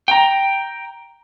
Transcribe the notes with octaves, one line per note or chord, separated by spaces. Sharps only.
G5 A#5